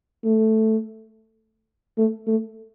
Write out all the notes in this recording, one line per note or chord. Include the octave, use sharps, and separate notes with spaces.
A3
A3
A3